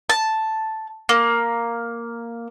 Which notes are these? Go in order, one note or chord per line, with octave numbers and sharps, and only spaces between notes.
A5
A#3